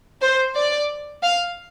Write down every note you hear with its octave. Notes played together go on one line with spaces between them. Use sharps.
C5
D5
F5